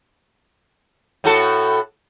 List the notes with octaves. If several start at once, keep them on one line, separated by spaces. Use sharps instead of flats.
A2 F#4 A4